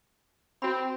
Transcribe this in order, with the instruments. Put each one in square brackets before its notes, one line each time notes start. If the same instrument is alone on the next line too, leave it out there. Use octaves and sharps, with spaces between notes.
[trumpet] C4 [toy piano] F#4 B5